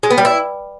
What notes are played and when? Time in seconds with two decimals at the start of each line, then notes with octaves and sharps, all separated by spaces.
0.03 G#3
0.10 B3
0.18 G3
0.25 E4